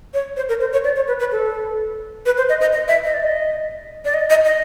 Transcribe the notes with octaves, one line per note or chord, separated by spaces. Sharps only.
C#5
C5
A#4
C5
C#5
D5
C#5
B4
B4
A4
B4
C5
D#5
D#5
D#5
E5
D#5
D5
D#5
D5
D#5
D#5
D#5